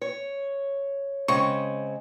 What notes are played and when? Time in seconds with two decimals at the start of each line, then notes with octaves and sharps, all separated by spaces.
0.01 C#5
1.28 C#3 G#3 C4 C#6